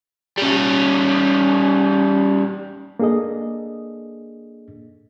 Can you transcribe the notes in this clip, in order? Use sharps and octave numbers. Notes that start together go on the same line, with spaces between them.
G3 C#4
A#3 D4 G#4 A4 D#5